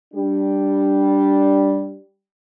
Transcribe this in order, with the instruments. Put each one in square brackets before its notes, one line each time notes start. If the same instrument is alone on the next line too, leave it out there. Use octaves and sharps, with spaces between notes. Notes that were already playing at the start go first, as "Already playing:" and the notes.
[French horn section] G3 D4 G4